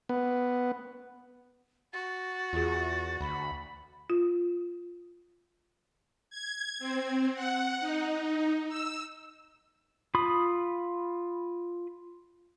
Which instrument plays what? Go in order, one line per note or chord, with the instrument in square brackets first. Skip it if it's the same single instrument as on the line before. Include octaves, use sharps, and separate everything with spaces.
[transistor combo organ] B3
[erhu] F#4 [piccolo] A6
[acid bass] E2 [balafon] F4 G#4
[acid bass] D2 [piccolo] B5
[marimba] F4
[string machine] G#6
C4
F#5
D#4
E6
[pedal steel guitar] F4 B5 D#6